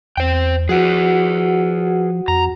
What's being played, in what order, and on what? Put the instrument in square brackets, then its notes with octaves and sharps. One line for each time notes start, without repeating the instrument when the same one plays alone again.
[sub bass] E2 [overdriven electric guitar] C5 G5
[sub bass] F3 [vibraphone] F#4 F#5 [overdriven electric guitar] G#4 B4
[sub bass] F2 [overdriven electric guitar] A#5